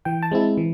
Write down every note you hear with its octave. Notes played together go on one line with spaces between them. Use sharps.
E3 G5
A5
G#3 C4 E4
E3